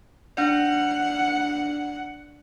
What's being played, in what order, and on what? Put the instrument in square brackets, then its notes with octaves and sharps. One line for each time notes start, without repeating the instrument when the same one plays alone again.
[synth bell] D4 D5 [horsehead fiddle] F#5